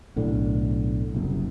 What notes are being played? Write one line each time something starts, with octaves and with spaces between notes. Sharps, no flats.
B1 A2 D3
F#1 C2